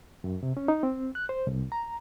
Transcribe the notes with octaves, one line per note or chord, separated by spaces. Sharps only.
F#2
C3
C#4
D#4
C4
F#6
C5
C2
A#5